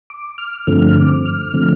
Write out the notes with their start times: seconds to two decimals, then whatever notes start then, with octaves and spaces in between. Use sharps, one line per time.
0.10 D6
0.38 F6
0.67 G2 D3 F3 A3 C4 F6
0.87 F6
0.96 D6
1.25 F6
1.53 D3 F3 A3 C4